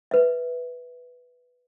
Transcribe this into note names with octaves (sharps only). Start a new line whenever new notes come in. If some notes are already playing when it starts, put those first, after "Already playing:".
B4 E5